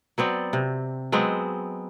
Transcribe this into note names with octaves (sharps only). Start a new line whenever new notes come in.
F#3 B3 C4 D5
C3
F#3 G#3 B3 C4